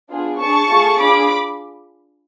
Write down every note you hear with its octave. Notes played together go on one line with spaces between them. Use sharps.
B3 D4 F4 G#4
D4 G#4 A5 C#6
A3 F4 G#4
D4 F4 G#4 B5 D6